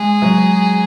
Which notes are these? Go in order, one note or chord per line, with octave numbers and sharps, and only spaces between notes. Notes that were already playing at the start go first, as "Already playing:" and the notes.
Already playing: G#3 G#4
F#3